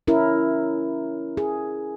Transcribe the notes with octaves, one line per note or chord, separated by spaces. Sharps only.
C#4 E4 A#4
G#4